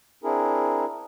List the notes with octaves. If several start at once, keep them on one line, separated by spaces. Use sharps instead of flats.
C4 D4 E4 G#4 A#4